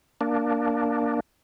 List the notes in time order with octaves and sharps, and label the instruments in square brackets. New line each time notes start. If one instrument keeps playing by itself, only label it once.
[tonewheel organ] A#3 D4